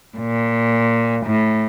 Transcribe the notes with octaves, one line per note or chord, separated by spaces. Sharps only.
A#2
A2